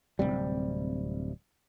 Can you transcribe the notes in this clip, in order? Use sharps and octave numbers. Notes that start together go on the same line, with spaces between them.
D1 D#2 C3 G3